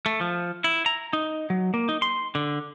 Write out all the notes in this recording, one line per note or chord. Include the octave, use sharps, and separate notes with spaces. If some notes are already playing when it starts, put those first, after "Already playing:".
A3
F3
E4
A#5
D#4
F#3
A#3
D#4
C6
D3